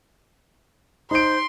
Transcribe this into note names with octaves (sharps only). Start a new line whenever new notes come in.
D#4 C5 C6 D7